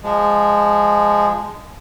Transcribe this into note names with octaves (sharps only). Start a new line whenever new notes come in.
F3 G#3